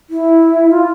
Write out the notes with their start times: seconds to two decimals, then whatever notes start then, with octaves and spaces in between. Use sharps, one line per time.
0.10 E4
0.72 F4